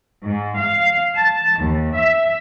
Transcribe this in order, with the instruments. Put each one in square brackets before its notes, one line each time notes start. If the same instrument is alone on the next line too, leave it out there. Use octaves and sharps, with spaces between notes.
[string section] G#2
F5
A5
D#2
E5